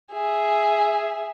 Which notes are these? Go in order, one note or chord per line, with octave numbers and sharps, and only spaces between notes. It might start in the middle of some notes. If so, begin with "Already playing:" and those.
G#4 E5